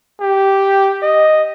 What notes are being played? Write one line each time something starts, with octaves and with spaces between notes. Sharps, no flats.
G4
D#5